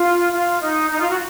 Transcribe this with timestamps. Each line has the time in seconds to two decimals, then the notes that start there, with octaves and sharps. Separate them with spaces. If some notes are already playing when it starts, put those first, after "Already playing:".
Already playing: F4
0.32 F4
0.61 D#4
0.90 D#4
1.00 F4
1.09 F#4